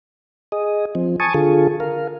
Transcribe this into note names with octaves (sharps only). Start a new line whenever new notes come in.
G#4 D#5
F3 C4
G#5 A5 C#6 D#6
D3 F4 G#4 A4
A#4 F5